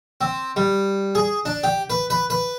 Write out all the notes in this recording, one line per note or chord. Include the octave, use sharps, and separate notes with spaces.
C4
G3
G#4
D4
G4
B4
B4
B4